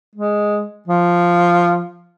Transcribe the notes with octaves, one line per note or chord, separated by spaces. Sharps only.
G#3
F3